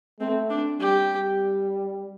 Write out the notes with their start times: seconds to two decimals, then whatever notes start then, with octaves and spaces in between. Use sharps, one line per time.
0.20 A3 C4
0.50 D4
0.80 G3 G4